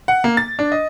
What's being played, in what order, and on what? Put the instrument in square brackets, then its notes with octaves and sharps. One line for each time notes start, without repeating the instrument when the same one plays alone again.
[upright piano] F#5
A#3
A6
D4
D#5